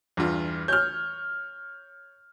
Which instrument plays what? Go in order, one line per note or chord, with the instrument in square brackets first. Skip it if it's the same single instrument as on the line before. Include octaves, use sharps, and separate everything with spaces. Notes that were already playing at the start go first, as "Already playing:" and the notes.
[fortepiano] E2 G2 F4
[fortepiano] C#5 [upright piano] F6 G6